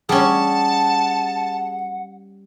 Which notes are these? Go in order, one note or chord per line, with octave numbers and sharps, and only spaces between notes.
G3 C#4 G#4 F#5 A5